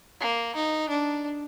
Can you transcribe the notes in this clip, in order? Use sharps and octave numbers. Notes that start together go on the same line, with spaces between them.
A#3
D#4
D4